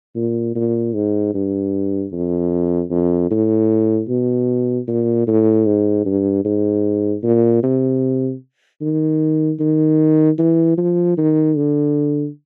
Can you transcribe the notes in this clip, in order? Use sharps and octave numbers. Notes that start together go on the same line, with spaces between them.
A#2
A#2
G#2
G2
F2
F2
A2
B2
A#2
A2
G#2
G2
G#2
A#2
C3
D#3
D#3
E3
F3
D#3
D3